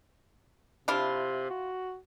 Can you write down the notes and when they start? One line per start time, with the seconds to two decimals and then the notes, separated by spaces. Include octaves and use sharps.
0.88 C3 D4 E4 F4
1.50 F#4